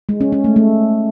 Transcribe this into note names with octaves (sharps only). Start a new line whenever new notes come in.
G#3
C#4
C#4
A3
A3